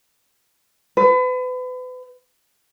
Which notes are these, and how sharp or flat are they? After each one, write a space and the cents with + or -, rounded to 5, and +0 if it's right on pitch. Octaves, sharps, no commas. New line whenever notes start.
B4 +35